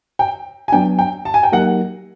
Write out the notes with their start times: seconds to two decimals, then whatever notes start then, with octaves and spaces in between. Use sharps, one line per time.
0.19 G5
0.68 G#5
0.72 F#3 B3 D4 G5
0.99 G5
1.25 A5
1.34 G#5
1.43 G5
1.52 F#3 A#3 D#4 G4 A#4 F#5